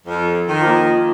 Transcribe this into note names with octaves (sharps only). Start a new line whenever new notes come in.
F2
D#3
F3 A#3